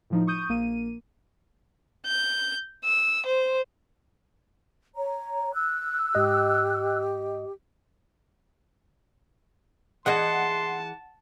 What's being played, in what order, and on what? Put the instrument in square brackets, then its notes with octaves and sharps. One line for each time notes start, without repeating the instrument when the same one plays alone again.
[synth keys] A2 F3 D#4
C#6 D#6 G6 D#7
A#1 A#3 D#7
[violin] G6
E6
C5
[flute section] C#5 A#5
E6 F#6
[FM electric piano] G#2 D#5 [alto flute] G4
[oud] E3 G#4 D#5 [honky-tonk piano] F#5 [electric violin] A5 [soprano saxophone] C6